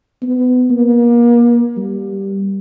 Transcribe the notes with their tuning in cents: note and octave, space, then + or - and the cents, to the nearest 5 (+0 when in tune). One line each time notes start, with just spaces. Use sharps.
B3 +25
A#3 +35
G3 -5